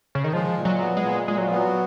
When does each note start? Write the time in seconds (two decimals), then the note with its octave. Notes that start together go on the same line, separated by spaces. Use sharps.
0.15 C#3
0.24 D#3
0.33 F3 G#3
0.57 A#2
0.65 F#3
0.81 B3
0.97 G#3
1.04 A#2
1.28 A#2 G#3
1.38 F#3
1.47 F3 B3
1.56 F#3